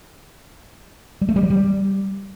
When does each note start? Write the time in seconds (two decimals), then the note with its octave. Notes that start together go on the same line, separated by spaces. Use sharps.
1.21 G3
1.29 A3
1.36 G3
1.43 F#3
1.50 G3